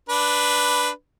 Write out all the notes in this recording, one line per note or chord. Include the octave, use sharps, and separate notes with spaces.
D4 B4